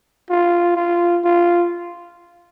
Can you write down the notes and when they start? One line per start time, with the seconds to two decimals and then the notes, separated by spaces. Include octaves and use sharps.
0.30 F4
0.76 F4
1.24 F4